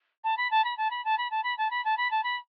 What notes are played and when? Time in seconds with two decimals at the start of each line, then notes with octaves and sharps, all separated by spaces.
0.24 A5
0.37 B5
0.50 A5
0.64 B5
0.77 A5
0.90 B5
1.04 A5
1.17 B5
1.30 A5
1.43 B5
1.57 A5
1.70 B5
1.84 A5
1.97 B5
2.10 A5
2.23 B5